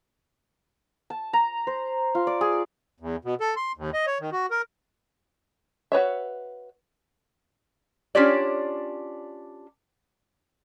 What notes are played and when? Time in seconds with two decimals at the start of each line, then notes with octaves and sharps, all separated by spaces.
1.10 A5
1.33 A#5
1.67 C5
2.15 F4
2.27 D5
2.41 G#4
3.00 E2
3.25 B2
3.41 A4
3.56 C6
3.77 D#2
3.94 D#5
4.07 C#5
4.21 D#3
4.32 F#4
4.51 A#4
5.92 F#4 B4 C#5 E5
8.15 C#4 D4 F4 G4 C#5 D5